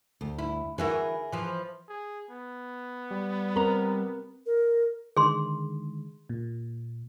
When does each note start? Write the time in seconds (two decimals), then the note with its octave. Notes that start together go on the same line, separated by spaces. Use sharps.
0.21 D2
0.38 E4
0.78 E3 E4 F#4 G#4 A#4
1.32 E3 F3
1.88 G#4
2.31 B3
3.11 G3
3.56 C4 A#4 A#5
4.46 A#4
5.17 D3 D#3 G#3 G#4 C6
6.29 A#2